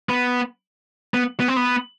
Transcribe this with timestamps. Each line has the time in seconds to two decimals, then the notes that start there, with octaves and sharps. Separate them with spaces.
0.09 B3
1.14 B3
1.40 B3
1.48 C4
1.56 B3